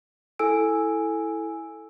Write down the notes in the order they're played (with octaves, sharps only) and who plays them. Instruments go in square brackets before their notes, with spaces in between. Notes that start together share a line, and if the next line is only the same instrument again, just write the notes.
[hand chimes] E4 A4 G#5 E6 D7